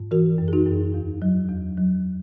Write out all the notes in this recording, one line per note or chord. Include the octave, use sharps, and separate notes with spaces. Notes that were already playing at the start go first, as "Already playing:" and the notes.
Already playing: G#2
E3 F#4 A#4
F#2
G#4
D#4 F#4
F#2
E2
F#3
E2
F#3